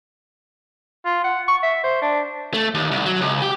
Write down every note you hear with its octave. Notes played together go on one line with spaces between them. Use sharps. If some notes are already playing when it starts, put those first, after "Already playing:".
F4
F#5
C#6
E5
C5
D4
A3
D#2
C2
F#3
C#2
G4